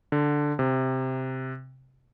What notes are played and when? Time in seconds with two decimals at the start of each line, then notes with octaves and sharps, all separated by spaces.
0.12 D3
0.59 C3